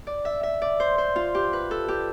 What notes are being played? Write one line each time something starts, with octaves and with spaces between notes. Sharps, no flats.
D5
E5
E5
D5
C5
C5
F4
G4
B4
A4
G4